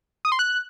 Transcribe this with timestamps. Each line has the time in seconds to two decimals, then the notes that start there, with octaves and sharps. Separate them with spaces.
0.25 D#6
0.32 C6
0.39 F#6